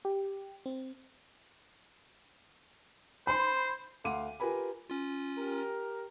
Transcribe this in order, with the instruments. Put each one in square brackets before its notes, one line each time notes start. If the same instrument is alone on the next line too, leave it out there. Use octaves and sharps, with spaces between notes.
[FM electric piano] G4
C4
[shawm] C5 [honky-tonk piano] B5 C6
[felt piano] D2 F5 F#5 C6 D6 D#7
F4 G4 A#4 B4 G#5 B5
[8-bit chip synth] C#4 F4
[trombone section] G4 A#4